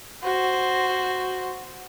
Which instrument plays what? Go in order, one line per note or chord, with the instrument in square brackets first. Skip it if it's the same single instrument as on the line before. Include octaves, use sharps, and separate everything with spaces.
[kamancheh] F#4 C5